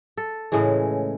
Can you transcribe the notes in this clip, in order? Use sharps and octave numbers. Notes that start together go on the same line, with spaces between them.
A4
A2 C#3 E3 G#3